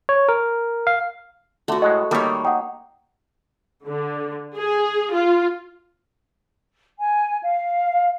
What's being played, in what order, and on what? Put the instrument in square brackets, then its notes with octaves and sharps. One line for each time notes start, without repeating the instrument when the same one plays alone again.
[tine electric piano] C#5
A#4
F5
[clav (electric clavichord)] D3 [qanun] A3 F#4
[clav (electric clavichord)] A2 G#3 F#5 [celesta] D#5
[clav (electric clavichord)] D#3 G3 A3 [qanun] A#3 C#5
[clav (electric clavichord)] D#4 [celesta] F#5 G5
[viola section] D3
G#4
F4
[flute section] G#5
F5